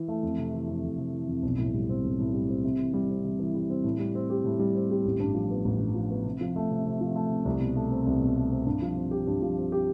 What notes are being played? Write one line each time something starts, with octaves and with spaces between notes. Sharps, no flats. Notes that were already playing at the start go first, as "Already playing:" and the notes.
Already playing: E3
A3
F2
C3
E3
F2
F2
C3
E3
F2
B1
A2
G3
C4
B1
A2
G3
C4
C3
E3
G3
C4
C3
E3
G3
C4
A2
G3
C4
G4
A2
G3
C4
G4
A1
G2
F3
B3
A1
G2
F3
B3
C3
F3
A3
C3
C3
F3
A3
C3
C2
B2
A3
C4
C2
B2
A3
C4
G2
F3
C4
G4
G2
F3
C4
G4